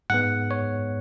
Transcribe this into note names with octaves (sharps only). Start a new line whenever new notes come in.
G#2 G#3 B3 F#5
C#5